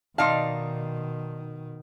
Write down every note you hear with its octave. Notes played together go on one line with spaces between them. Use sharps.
B2 D#3 D#4 D5 F5 A5 C6